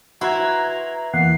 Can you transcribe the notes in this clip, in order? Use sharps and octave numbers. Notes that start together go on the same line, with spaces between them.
E4 F#4 B4 A#5 C6 G#6
E2 A#3 F#5 C7